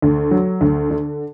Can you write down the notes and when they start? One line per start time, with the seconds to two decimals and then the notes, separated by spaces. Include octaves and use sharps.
0.02 D2
0.31 F#3
0.61 D2
0.90 D3